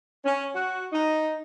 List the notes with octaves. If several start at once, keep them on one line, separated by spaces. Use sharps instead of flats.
C#4
F#4
D#4